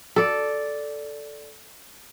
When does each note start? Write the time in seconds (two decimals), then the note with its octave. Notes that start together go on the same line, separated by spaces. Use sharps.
0.16 A4 D5